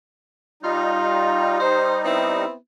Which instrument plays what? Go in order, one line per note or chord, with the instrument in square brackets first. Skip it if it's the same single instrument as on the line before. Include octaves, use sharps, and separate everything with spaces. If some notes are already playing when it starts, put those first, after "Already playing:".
[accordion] G3 D#4 [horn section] F4
[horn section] C5
B3 C4 E4